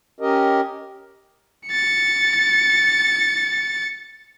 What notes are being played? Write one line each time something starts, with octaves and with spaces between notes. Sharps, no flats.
C#4 G4 A#4 D#5
A6 C#7